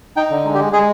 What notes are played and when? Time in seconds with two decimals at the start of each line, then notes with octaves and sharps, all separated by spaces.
0.17 D#4 G5
0.31 D3
0.45 G#3
0.55 G4
0.59 G#3
0.73 G#3 G#4